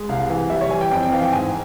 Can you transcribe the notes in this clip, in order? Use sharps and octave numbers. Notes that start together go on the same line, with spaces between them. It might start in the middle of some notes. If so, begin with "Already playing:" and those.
Already playing: G#3
C2 F5
E3
G3 E5
C#5
E3 G#5
G5
F2 G5
G5
E3 F5
G5
G#2 G#5